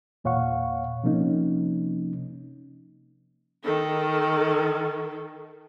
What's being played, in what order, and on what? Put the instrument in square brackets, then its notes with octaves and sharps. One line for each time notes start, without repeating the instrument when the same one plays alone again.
[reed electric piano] E2 A#2 C#5 F5 F#5 C#6
C3 F3 A#3 C#4 D#4
[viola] D#3 A4